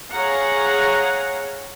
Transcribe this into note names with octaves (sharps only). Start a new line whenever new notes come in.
G#4 C#5 F5 F#5 A#5